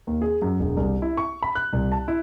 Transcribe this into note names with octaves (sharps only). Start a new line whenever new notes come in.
D#2
G#4
F#2
E1
C2
E4
C#6
B5
F#6
C2
A5
E4